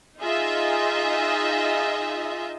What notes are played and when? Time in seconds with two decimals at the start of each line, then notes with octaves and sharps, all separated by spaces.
0.19 D#4 F4 G#4 D#5 E5